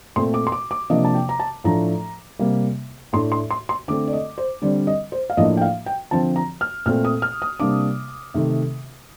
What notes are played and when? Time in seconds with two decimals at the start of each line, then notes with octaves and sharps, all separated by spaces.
0.16 A#2 A3 C4 C6
0.34 D6
0.47 C6
0.52 D6
0.71 D6
0.90 C3 F3 A#3 D4 D#5
1.05 A5
1.15 G5
1.29 A#5
1.40 A5
1.64 A2 F3 A3 D4 A#5
2.39 C3 G3 A#3
3.13 A2 A3 D4 C6
3.32 C6
3.51 C6
3.69 C6
3.88 D3 A3 C4 D6
4.07 D5
4.13 D#5
4.38 C5
4.62 D3 G3 C4 D5
4.87 D#5
5.12 C5
5.30 F5
5.37 A2 F3 A#3 D4 D#5
5.57 G5
5.62 F5
5.86 G5
6.11 D3 F3 C4 A5
6.36 A#5
6.61 F6
6.86 A#2 A3 C4 F6
7.05 D#6
7.22 F6
7.42 D#6
7.60 C3 G3 A#3 D4 D6
8.34 C3 D#3 A3 C4